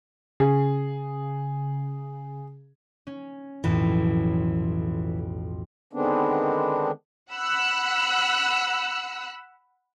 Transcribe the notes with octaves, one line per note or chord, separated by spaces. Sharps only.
C#3 G#4
C#4
B1 F2 A2 E3
D3 D#3 G#3 B3 C4 D4
F#5 B5 E6 F#6